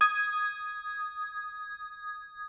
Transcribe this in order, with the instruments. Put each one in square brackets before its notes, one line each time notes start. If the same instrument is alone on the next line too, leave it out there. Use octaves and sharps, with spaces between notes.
[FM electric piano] D#6 G#6